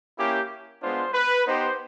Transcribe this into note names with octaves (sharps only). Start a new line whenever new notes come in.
A#3 C#4 E4 G4
G#3 B3 D4 F4 C5
B4
B3 D#4 G4 C5